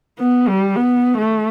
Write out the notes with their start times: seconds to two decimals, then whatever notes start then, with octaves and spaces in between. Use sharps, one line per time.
0.19 B3
0.48 G3
0.76 B3
1.18 A3